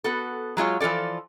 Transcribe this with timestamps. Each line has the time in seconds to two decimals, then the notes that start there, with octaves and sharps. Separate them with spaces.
0.04 B3 F#4 A4
0.57 F#3 G#3 F4 C#5
0.80 E3 F3 F4 A4 D5